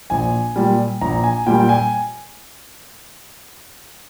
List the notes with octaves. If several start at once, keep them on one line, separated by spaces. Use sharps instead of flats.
A#1 G#5
A#2 G3
A#1 A#5
G#5
A#2 G3 G5
G5
G#5